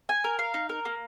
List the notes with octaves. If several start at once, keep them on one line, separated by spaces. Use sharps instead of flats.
G#5
A#4
F5
D#4
A#4
A#3